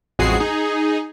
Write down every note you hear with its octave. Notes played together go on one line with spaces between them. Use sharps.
A1 F2 G#3 F#4 G#4 C7
D#4 G#4